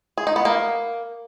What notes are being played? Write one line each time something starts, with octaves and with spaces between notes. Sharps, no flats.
G#4
D#4
B3
A#3